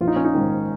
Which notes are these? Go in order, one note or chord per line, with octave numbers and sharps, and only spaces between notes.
A#1 F4
D#4
C#4
D#4
G#2 D#3